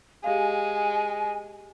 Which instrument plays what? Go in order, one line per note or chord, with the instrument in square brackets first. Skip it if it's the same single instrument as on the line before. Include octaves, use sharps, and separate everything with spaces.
[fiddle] G#3 [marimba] G4 F5 [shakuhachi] G#5